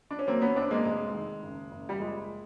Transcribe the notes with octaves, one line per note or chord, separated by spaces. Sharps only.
D4
C#4
F#3 A#3 C4
B3 C#4
F#2 C4 D4
G#3 A#3
F1 G#3
D#3
F#1
F#1
G3
F3 G#3